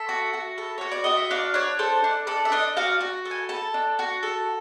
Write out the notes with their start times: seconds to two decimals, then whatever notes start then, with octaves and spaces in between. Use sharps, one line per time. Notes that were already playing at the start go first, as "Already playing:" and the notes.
Already playing: A4 E5
0.09 F#4
0.33 F#4
0.58 A4
0.78 F#4 C#5
0.92 D5
1.04 F#4 D#5
1.17 E5
1.31 D4 F5
1.54 D4 C#5
1.79 A4 C5
2.04 D4
2.27 A4 D5
2.45 E5
2.52 D4 D#5
2.77 F#4 F5
3.01 F#4
3.25 A4
3.31 G#5
3.49 A4 A5
3.74 D4
3.99 F#4
4.23 A4